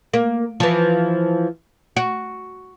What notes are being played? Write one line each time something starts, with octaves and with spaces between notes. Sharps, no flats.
A#3
E3 F3
F#4